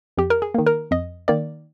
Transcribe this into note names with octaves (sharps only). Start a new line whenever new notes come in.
F2 G4
A#4
G#4
D#3 A#3
A#4
F2 D#5
D#3 A#3 D5